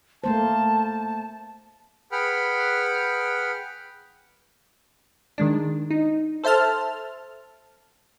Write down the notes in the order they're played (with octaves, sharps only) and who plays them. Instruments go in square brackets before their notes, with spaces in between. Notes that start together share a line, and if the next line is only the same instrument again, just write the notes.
[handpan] A3 A#3 C5 [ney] A5
[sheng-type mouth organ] G#4 B4 F#5 G5 B5 F6
[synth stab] D#3 G#3 D4
D#4
A4 C5 E5 A5 F6